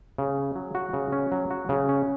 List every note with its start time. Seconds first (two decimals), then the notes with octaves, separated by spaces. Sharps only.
0.18 C#3
0.38 C#4
0.56 F#3
0.75 F#4
0.93 C#3
1.12 C#4
1.32 F#3
1.51 F#4
1.69 C#3
1.89 C#4